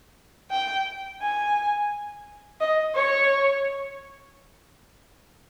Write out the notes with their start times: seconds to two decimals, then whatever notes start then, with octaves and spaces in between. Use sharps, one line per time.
0.51 G5
1.22 G#5
2.61 D#5
2.95 C#5